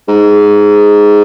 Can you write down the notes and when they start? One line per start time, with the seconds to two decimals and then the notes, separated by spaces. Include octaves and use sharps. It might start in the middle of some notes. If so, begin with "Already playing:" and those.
0.08 G#2